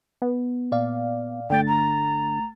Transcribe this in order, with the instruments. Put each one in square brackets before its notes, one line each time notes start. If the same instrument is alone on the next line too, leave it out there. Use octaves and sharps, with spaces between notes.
[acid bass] B3
[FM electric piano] A#2 D5 F5
[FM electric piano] G1 A3 A6 [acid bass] D3 [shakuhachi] G5
[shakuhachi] A#5